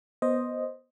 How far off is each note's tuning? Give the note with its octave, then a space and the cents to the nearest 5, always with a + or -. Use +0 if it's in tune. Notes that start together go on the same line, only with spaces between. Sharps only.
B3 -10 C5 +5 D#5 +0